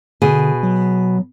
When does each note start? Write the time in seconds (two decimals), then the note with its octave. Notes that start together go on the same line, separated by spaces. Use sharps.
0.22 B2 D3 G#4
0.63 F#3